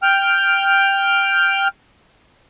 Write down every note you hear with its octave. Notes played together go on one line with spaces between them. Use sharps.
G5 F6